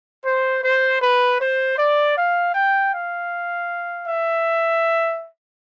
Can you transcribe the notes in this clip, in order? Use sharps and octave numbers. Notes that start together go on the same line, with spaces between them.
C5
C5
B4
C5
D5
F5
G5
F5
E5